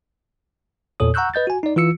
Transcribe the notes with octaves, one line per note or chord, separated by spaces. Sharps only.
E2 A#2 A4 C#5 D#6
F#5 A#5 C#6 E6 F#6 G6
B4 D#5 G6 A6
F#4 G#5
D#4 D5
E3 F4 E6 C#7